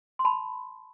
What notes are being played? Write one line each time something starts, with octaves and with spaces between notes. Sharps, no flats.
C6
A5 B5